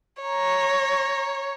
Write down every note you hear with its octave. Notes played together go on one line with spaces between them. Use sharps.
C#5 A#5